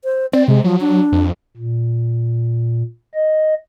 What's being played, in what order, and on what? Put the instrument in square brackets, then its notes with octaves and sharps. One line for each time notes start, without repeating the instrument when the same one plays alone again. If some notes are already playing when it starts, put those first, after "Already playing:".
[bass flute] C5
[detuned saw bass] C4 [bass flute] D5
[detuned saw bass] C3 [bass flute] G#3
[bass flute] F3 [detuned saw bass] F#3
[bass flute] D4
[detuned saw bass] F2
[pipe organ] A#2
D#5